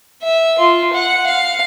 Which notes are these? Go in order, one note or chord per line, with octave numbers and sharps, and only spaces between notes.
E5
F4
F#5
F5